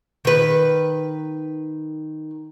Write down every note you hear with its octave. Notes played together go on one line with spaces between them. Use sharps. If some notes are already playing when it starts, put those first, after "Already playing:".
D#3 B4